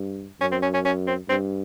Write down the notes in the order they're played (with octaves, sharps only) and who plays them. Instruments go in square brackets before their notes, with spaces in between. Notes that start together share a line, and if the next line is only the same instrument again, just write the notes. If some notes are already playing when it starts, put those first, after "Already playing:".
Already playing: [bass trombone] G2
[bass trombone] F#2 [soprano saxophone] C#4
[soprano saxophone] C4
C#4
C#4
C#4
C4
[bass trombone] G2 [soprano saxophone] C4